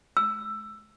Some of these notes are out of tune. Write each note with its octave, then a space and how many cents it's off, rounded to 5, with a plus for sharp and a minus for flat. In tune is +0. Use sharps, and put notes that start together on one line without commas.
E6 +10